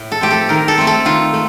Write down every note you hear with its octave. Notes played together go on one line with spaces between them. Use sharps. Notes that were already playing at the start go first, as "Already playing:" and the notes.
Already playing: A2
A4
F3 A3 C4 G4
A4
D#3 A#4
A4
A3 C4
A4
D#3 F4
A3